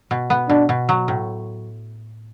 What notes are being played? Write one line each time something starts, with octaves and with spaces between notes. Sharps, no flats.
B2
B3
B2 D4
B2
F#3
A2